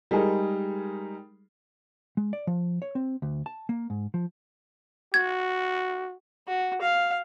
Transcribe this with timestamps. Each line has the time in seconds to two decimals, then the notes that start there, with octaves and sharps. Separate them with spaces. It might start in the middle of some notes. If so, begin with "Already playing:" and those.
0.11 G3 G#3 D#4 G#4 A#4
2.17 G#3
2.33 D5
2.47 F3
2.82 C#5
2.95 C4
3.22 D2
3.46 A5
3.69 A#3
3.90 G#2
4.14 F3
5.14 F#4 G#6
6.48 F#4
6.81 F5